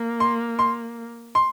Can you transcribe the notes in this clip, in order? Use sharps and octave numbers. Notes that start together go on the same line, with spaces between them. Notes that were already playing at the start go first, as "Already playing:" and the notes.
Already playing: A#3
C6
C6
C6